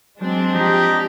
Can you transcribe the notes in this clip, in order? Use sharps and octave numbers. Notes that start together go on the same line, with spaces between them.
F#3 G#3 C4 D4
F3 D#4 G4